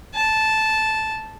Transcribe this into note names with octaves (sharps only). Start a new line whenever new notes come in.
A5